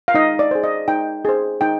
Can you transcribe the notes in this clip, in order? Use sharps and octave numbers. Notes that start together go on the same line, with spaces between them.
F5
D#4 D#5
D5
G#4 C5
D#5
D#4 G5
G#4 C5
D#4 G5